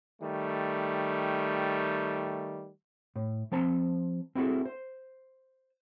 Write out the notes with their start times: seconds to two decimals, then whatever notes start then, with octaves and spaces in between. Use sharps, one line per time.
0.22 D#3 G3 A3
3.16 A2
3.52 F3 C4 A5 A#5
4.35 C4 E4 F#4 G#4 A4
4.65 C5